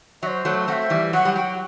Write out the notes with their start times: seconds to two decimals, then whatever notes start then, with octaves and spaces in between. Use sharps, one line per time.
0.22 F#3 C5 E5
0.45 F#3 A3
0.68 A3 C4 E5 F#5
0.90 E3 G3
1.13 F#3 F#5
1.25 G3
1.36 F#3 G5